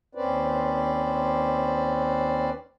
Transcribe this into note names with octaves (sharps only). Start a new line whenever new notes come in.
D#2 C4 C#4 B4 C5 D5